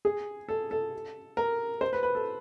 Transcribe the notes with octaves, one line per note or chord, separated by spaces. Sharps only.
G#4
A4
A4
A#4
C5
B4
B4
A4